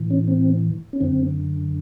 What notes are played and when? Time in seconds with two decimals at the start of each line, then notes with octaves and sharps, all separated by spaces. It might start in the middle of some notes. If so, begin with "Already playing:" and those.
Already playing: A2 E3
0.10 C#4
0.28 C4
0.93 C#4
1.01 F#2 D3 C4